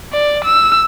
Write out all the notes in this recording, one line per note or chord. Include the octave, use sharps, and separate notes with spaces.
D5
E6